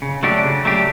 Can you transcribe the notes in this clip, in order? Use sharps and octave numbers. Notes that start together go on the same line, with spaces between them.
C#3
F#3 A3 D4 G4
C#3
F#3 A3 D4 G4